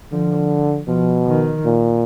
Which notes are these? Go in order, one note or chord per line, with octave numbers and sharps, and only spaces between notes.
D3 F3
B2 F3
D#3
A#2